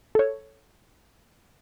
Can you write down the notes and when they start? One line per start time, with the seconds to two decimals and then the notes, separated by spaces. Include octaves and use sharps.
0.15 A4 C#5